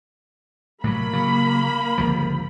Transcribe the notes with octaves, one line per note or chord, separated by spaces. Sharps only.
A2 C3 F#3 A#3 B5
C#3 F#3
G1 C#2 F3